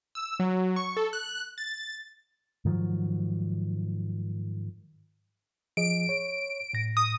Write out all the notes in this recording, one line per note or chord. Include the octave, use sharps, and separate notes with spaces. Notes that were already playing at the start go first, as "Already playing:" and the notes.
E6
F#3
C#6
A4
F#6
A6
G#2 D#3 F3 F#3
F3 G#4 D#5 D7
C#5
A2 A#6
D#6